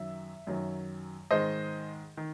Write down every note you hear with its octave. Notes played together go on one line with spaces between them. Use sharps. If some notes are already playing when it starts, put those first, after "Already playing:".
Already playing: F#2 D#3 F#3 E5
F#2 D#3 F#3
G#2 D#3 G#3 C5 D#5
D#3